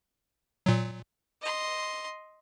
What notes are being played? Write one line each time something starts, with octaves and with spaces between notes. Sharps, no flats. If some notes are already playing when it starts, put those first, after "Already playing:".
A#2 F#3
D#5 C6